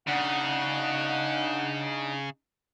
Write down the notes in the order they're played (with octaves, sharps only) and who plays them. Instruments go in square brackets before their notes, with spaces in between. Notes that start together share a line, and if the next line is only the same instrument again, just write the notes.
[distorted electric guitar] C#3 [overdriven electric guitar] D4 D#4 [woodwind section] F#5